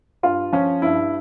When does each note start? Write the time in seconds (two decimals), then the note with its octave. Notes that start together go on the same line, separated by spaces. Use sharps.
0.23 G2 F4
0.52 F3 C#4
0.82 G2 E4